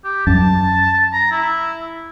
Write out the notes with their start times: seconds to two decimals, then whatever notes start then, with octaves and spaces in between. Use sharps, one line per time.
0.04 G4
0.27 F#2 A5
1.13 A#5
1.31 E4